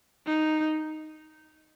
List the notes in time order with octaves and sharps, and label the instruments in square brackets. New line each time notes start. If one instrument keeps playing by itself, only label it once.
[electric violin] D#4